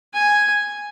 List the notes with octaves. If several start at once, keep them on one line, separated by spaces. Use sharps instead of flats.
G#5